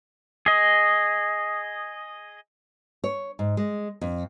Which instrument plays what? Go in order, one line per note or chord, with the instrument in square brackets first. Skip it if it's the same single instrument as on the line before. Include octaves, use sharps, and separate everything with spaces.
[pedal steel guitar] G#4 D#5
[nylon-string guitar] C#5
G#2
G#3
F2